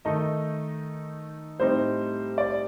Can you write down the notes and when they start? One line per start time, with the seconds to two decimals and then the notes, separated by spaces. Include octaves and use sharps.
0.05 D#3 A3 D#4 D#5
1.60 A2 G3 C4 D#4 C5
2.38 D5